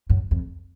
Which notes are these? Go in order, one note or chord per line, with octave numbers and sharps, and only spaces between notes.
F#2
F2